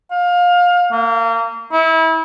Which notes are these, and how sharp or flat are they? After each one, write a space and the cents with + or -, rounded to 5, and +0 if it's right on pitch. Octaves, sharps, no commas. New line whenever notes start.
F5 +25
A#3 -30
E4 -30